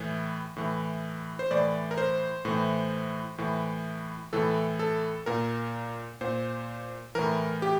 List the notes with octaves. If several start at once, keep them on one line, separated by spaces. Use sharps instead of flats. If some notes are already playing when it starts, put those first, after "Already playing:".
Already playing: A2 E3
A2 E3
C5
A2 E3 D5
A#4
C5
A2 E3
A2 E3
A2 E3 A4
A4
A#2 A#4
A#2 C5
A2 E3 A#4
G4